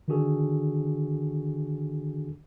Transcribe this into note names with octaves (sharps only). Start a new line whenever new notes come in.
D3 D#3 D4 F#4 G#4 A4